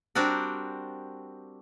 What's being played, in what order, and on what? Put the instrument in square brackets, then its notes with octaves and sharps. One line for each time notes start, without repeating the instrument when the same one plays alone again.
[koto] G3 C4 D4 F#4 A#4